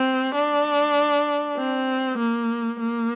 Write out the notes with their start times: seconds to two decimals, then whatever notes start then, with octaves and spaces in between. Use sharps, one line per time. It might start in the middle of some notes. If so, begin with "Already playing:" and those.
Already playing: C4
0.35 D4
1.57 C4
2.18 A#3
2.79 A#3